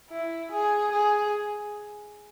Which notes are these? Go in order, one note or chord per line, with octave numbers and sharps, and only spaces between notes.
E4
G#4
G#4